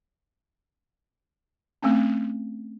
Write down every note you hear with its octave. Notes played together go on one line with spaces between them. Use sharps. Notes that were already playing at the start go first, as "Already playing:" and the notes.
A3 C4 C#4